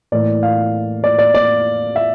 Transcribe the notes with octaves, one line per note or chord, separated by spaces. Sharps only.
A2 E3 A#3 D5
F5
D5
D5
D5
E5